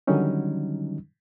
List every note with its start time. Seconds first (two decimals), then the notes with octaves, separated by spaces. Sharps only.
0.07 D3 D#3 F#3 G3 C#4 D#4